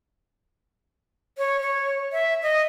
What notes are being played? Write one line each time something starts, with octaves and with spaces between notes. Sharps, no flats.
C#5
C#5
E5
D#5